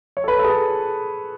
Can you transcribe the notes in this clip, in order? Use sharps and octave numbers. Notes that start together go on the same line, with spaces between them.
C#5
A4
B4
A4
G#4
A4